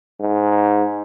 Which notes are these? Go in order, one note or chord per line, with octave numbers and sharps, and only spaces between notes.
G#2